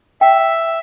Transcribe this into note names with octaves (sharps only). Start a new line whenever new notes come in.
E5 G5